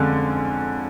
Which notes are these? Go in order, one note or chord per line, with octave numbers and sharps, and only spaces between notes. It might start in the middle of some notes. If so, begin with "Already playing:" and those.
Already playing: F2 D3 G#3 C#4